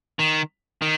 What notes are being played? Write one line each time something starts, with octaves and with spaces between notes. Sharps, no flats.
D#3
D#3